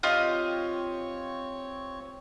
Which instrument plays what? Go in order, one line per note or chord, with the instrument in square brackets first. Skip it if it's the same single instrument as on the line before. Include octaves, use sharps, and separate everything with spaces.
[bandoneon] C4 C#5 C#6 [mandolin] F4 G4 D#5